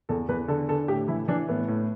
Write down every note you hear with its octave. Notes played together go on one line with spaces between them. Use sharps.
E2 A4
E2 B4
D3 A4
D3 A4
A2 G4
E3 E4
E3 D4
A2 B3
A2